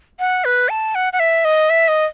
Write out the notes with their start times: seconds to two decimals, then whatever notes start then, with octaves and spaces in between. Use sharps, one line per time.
0.20 F#5
0.45 B4
0.69 A5
0.95 F#5
1.13 F#5
1.20 E5
1.45 D#5
1.70 E5
1.88 D#5